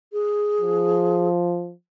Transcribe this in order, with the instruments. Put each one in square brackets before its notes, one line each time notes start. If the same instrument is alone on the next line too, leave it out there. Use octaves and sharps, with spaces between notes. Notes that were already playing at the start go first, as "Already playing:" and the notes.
[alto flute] G#4
[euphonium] F3